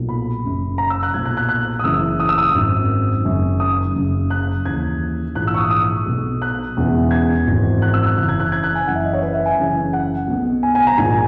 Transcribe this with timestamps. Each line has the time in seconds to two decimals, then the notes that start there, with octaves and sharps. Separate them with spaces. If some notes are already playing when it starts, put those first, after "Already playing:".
Already playing: B1 A#2
0.09 B5
0.44 F#1 F#2 C#3
0.78 A#5
0.90 E6
1.03 F#6
1.14 B1 A#2 G#6
1.25 F#6
1.37 F#6
1.49 F#6
1.79 D#6
1.84 F#1 F#2 E3 E6
2.20 D#6
2.29 E6
2.38 D#6
2.55 G#1 F#2 D#3
3.25 F#1 F#2 D#3
3.60 D#6
3.95 F#1 F#2 C#3
4.30 F#6
4.66 D#2 C#3 E3 G#6
5.35 A#1 G#2 E3 F#6
5.47 E6
5.54 C#6
5.59 D#6
5.70 D#6
6.06 B1 B2
6.42 F#6
6.76 E1 E2 C#3 E3
7.11 G#6
7.47 G#1 F#2 E3
7.82 F#6
7.94 E6
8.06 F#6
8.17 F#1 F#2 C#3 E3 F#6
8.29 G#6
8.40 F#6
8.52 G#6
8.64 F#6
8.75 G#5
8.87 F#1 F#2 C#3 E3 F#5
8.95 E5
9.05 D#5
9.13 C#5
9.22 B4
9.34 E5
9.46 G#5
9.57 F#1 F#2 C#3 E3
9.93 F#5
10.28 B1 B2
10.63 G#5
10.75 G#5
10.87 A#5
10.98 A#1 G#2 D#3 G#5